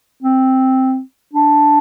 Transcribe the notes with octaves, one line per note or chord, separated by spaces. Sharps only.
C4
D4